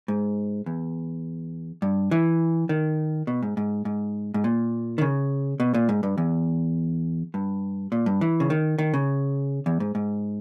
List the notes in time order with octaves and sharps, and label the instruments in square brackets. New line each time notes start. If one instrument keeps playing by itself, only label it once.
[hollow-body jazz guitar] G#2
E2
G2
E3
D#3
B2
G#2
G#2
G#2
G#2
A#2
D#3
C#3
B2
A#2
G#2
G2
E2
G2
A#2
G2
E3
C#3
D#3
D#3
C#3
E2
G#2
G#2